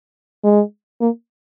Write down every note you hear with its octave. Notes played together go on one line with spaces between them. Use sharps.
G#3
A#3